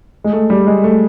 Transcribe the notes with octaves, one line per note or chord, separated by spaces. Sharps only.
G#3
A3
G3
G#3
A3